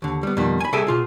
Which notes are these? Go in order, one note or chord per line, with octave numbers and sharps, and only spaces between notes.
D#2 D3
G3 B3
F2 B2 D#3 G3
G#5 B5
C2 G#4 A4 E5 G5 G#5
B2 F4 G#4